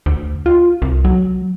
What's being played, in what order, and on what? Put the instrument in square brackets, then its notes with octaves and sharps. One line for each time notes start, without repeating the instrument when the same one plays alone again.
[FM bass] D2
F4
C2
F#3